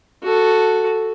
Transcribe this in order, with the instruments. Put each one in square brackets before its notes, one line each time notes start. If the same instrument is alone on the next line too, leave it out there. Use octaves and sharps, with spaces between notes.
[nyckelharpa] F#4 A4